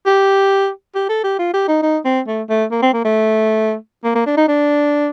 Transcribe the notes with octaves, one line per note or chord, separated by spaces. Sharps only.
G4
G4
A4
G4
F4
G4
D#4
D#4
C4
A3
A3
A#3
C4
A#3
A3
A#3
A#3
D4
D#4
D4